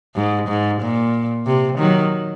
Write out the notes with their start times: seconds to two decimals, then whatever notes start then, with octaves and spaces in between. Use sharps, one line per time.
0.16 G#2
0.48 G#2
0.81 A#2
1.46 C3
1.78 D#3 F#3